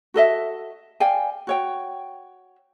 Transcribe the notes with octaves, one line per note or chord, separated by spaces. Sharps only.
F#4 A4 D#5 E5
D5 F5 G5 G#5
F#4 C#5 G5